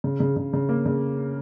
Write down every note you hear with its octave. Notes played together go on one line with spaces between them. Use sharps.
C#3
C#3
C#3
C#3
A#3
C#3